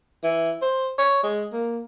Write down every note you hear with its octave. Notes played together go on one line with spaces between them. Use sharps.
E3
C5
C#5
G#3
A#3